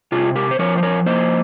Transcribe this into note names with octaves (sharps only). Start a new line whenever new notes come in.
C3 F4 G#4
G4 A#4
C5
F3 A#4 C#5
C5
A#4 C#5
A#3 C5 D#5